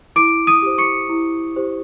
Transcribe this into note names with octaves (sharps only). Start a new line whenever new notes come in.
E4 D6 D7
D#6 D#7
G4 C5
C#6 C#7
E4
G4 C5